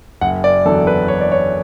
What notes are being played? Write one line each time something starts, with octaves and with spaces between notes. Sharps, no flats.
F#1 F#5
D5
E2 D3 F#3 A4
B4
F#1 C#5
D5
C#5